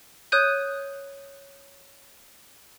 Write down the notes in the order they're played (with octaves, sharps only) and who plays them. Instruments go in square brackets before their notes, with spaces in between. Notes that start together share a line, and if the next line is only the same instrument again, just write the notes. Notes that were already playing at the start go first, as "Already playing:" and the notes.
[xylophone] C#5 D#6 F#6 G6 D#7